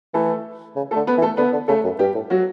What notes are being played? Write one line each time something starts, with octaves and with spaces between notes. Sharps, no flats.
E3 A3 A4
C#3
A3 A4
D3
B3 B4
E3
A3 A4
D3 B3 B4
D3
C#3 A3 A4
F#2
G2 G3 G4
A2
F#3 F#4